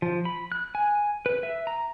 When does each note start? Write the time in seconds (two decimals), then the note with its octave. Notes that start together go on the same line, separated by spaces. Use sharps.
0.02 F3
0.25 B5
0.52 F#6
0.75 G#5
1.26 B4
1.43 E5
1.67 A#5